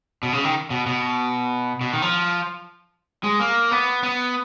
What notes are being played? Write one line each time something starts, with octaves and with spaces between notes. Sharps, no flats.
B2
C#3
D#3
B2
B2
B2
D#3
F3
G#3
A#3
B3
B3